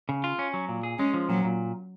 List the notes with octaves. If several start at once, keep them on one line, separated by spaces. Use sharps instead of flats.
C#3
F4
C#4
F#3
A#2
G#4
G#3 C#4
F3
A#2 F#3
A#2